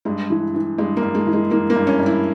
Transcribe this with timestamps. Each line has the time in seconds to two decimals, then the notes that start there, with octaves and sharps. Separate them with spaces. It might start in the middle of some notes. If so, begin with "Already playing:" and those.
0.05 G2 G#3
0.30 E3
0.54 E3
0.78 G2 G#3
0.97 A#3
1.02 G2
1.15 G#3
1.26 E3
1.33 G#3
1.51 E3 A#3
1.70 A#3
1.76 G2
1.87 C#4
2.00 G2
2.06 E4